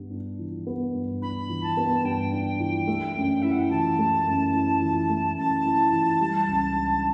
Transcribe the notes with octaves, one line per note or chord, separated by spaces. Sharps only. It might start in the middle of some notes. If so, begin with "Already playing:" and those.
Already playing: G2 B3
D4
E3
B3
G2
D4 B5
E3
A5
B3
G2 G5
D4
E3
A3
F#2
E4 E5
F#5
G5
E3 A5
A3
F#2
E4
E3
A3
F#2 A5
E4
E3
G3
C#2
D4